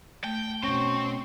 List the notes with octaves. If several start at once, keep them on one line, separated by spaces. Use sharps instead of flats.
A3 G5
B2 C4 C#4 C#6